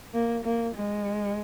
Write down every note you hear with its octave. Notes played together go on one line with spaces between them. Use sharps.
A#3
A#3
G#3